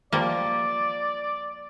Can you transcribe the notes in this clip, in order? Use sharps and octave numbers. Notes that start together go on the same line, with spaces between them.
F3 G3 A#3 D5